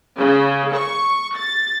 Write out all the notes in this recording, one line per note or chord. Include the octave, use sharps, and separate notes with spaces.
C#3
C#6
A6